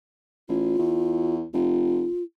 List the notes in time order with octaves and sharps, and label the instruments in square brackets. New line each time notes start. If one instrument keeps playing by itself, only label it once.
[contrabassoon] A1 [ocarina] F4
[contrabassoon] E2
[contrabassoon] F1 [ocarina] F4